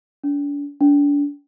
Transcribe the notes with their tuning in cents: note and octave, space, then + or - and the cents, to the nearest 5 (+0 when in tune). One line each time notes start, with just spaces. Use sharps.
D4 -40
D4 -35